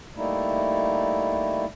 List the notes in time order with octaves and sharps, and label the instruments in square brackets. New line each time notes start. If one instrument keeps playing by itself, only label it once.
[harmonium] G3 A3 A#3 D#4 E4